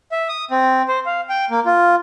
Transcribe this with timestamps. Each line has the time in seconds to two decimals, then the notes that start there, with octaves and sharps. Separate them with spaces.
0.12 E5
0.29 D#6
0.51 C4
0.88 C5
1.06 F5
1.29 G5
1.51 A#3
1.66 F4